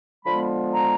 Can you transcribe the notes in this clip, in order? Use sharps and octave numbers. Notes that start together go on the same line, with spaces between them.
D3 F3 G#3 B3 B5
A#5